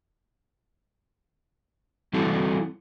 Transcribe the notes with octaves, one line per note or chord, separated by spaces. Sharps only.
E3 G3 C4 E4 F#4 A4